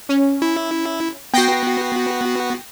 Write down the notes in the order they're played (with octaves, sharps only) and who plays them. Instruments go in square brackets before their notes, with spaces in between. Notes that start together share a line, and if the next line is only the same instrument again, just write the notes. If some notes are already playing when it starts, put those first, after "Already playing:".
[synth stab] C#4
[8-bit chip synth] E4
[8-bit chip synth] B3 F#4 [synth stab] G5 A#6 C7